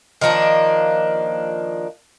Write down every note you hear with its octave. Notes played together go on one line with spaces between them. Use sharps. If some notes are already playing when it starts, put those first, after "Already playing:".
D#3 F3 A#3 D4